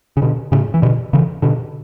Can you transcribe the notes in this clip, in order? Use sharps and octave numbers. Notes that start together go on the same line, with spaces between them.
C#3
B2 D3
A2 C#3
E3
B2 D3
C#3 E3
B2 D3